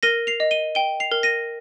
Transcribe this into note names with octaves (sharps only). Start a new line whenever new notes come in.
A#4 A#6 D#7
C7 F7
D#5
D#7 G7
G5 D#7 G7
C7 F7
A#4
A#6 D#7